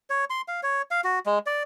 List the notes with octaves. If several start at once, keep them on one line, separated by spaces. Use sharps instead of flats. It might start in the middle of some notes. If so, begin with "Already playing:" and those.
C#5
C6
F5
C#5
F5
F#4
G#3
D5